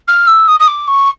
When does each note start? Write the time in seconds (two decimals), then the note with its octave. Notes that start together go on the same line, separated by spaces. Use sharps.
0.08 F6
0.27 E6
0.47 D#6
0.59 D#6
0.67 D6
0.87 C#6